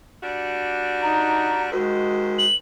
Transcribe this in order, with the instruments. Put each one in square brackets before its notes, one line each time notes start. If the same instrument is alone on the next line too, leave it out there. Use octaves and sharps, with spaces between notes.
[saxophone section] G3 D4 F#4
[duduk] D#4 [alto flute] A#5
[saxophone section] D#2 D#3 C5 [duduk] G#3 [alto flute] F#4
[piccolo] F#7